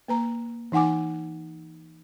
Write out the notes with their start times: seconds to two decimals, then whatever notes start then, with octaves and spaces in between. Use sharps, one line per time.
0.08 A#3 B4 A#5
0.72 E3 D#4 F#5 G#5 D6